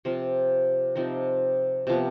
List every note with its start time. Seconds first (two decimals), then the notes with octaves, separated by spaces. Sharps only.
0.05 C3 F3 C4 F4
0.95 C3 F3 C4 D#4
1.87 C3 F3 B3